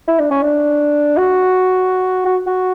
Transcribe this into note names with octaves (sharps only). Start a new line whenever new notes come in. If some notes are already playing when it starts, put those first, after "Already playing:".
E4
D4
C#4
D4
F#4
F#4
F#4